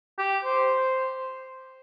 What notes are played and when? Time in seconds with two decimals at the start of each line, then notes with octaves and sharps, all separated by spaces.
0.18 G4
0.44 C5